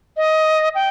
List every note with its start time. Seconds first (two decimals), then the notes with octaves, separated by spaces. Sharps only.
0.17 D#5
0.75 G5